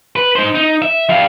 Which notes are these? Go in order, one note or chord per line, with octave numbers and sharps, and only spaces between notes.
B4
D#4 C5
D#4
E5
G3 F5